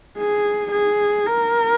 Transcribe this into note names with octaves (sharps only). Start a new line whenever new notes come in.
G#4
G#4
A#4